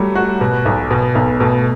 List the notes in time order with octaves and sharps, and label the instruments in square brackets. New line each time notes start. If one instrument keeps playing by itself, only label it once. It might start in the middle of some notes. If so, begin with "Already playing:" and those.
Already playing: [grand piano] F#3 A3 [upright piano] G3
[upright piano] F#4
B2
B1
B2
[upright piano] B1 [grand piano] B3
[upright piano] B2 [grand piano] A3